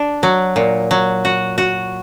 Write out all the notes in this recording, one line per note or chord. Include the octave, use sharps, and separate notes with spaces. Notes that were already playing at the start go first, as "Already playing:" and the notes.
Already playing: D4
F#3
A#2
F#3
F#4
F#4